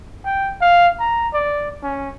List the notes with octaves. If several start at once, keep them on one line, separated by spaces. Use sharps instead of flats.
G5
F5
A#5
D5
C#4